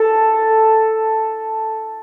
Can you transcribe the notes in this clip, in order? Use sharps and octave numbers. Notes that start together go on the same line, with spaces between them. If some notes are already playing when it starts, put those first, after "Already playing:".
Already playing: A4